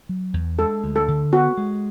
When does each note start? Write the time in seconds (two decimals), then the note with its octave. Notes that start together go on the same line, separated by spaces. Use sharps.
0.09 F#3
0.33 E2
0.59 G#3 A4
0.84 D2
0.96 A4
1.08 D3
1.32 B3 F#4
1.57 G#3